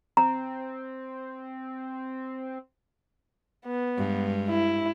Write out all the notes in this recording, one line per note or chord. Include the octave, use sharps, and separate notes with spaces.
C4 A#5
B3
G2 G#3
E4